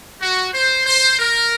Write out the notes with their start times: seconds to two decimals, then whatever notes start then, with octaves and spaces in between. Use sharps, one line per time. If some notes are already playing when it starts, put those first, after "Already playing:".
0.21 F#4
0.53 C5
0.86 C5
1.18 A#4